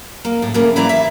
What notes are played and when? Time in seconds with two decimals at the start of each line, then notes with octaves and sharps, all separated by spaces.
0.25 A#3
0.42 A2
0.54 A2 C#3 A#3
0.76 E3 E4 D5 F5 A#5
0.89 E5